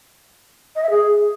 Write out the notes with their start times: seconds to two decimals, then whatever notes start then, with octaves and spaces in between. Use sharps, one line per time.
0.75 D#5
0.82 E5
0.90 G#4